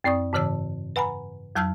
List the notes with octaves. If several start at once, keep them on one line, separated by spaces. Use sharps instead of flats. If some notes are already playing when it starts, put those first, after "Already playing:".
F#2 C4 D5 C#6 D#6
G#2 C#3 E3 C#5 A5 E6
B4 F#5 G#5 A#5 B5
F2 F#3 A5 E6 F6 G6